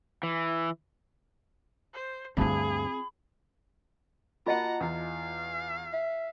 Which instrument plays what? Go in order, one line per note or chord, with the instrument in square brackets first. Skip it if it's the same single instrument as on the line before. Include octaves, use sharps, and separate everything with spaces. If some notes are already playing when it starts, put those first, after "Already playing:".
[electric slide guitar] E3
[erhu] C5
[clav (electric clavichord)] D2 G2 A5 [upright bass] C4 F4 [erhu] G#4 [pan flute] B5
[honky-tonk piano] A#3 F#4 [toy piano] F4 D#5 A5 [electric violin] F#5 A#5
[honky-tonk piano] E2 [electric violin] F5
[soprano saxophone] E5